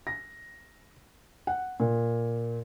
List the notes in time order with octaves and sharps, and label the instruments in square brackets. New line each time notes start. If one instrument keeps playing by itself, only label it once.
[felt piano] A#6
F#5
A#2